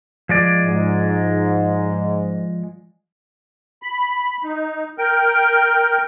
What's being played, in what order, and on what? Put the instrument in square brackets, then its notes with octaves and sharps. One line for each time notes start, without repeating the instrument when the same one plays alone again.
[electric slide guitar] F3 G#3 D5
[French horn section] G#2
[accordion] B5
D#4
A#4 G5